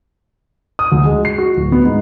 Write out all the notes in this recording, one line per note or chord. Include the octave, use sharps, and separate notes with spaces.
D#6
D2
G#3
C7
F#4
D1
B3
G#2